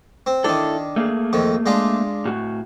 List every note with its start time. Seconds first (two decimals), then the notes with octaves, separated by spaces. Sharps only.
0.26 C4
0.44 D#3 D4 E4 A4
0.96 A3 A#3 G#4
1.33 F2 D#3
1.66 G#3 D4 F4
2.25 A2 F#4